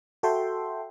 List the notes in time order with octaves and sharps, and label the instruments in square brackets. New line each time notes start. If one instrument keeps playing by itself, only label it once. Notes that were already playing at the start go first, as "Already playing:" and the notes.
[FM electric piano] F#4 A4 E5 G5 C6